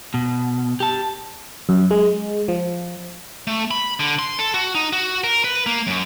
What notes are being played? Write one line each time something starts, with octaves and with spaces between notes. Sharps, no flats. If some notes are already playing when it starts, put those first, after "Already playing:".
B2
G4 A5
F#2
G#3
F3
A3
B5
D3
C6
A4
F#4
D#4
F#4
A#4
B4
A#3
F#2